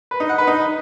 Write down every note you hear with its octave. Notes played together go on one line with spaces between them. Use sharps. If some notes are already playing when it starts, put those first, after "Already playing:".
B4
D#4
F#5
B4
D#4